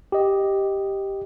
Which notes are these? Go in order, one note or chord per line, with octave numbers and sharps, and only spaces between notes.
G4 D#5